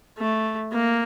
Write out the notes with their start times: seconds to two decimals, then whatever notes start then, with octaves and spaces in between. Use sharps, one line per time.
0.19 A3
0.72 A#3